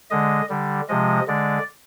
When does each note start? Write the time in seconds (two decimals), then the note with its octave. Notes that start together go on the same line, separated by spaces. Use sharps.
0.11 D3 G#3 D#5
0.49 D3 G3
0.88 C3 F3 G#3 D#5
1.27 D3 G#3 D5